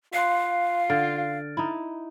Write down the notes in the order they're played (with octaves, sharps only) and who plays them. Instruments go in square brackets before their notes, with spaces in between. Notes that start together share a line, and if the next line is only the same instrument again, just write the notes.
[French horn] F4 [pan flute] F5 [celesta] C6 F#6 C7
[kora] D3 [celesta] F6 A6 D7
[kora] D#4 E4